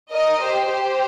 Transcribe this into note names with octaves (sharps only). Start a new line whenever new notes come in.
A#4 D#5
G4 C5
G4 C5